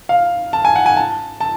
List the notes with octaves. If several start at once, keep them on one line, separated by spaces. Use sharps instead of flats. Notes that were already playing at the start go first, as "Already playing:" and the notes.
F5
A5
G#5
F#5
G#5
A5
A5